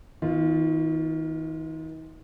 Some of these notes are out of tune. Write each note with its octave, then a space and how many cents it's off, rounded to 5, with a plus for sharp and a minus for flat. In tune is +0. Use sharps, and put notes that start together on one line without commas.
D#3 +40 B3 +0 F4 +0